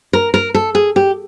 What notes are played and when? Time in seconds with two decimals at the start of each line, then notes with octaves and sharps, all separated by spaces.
0.13 A#4
0.34 A#4
0.55 A4
0.75 G#4
0.96 G4